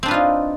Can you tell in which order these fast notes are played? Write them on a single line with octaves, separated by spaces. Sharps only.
C4 D4 B4 F4 D#4